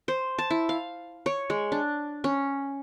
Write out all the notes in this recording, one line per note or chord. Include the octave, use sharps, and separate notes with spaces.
C5
A5
E4
F5
C#5
G#3
D4
C#4